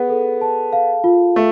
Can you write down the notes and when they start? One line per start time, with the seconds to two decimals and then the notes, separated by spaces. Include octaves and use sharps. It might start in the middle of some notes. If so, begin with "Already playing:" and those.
Already playing: B3 G#4
0.09 A4
0.41 A5
0.73 F5
1.04 F4
1.36 A3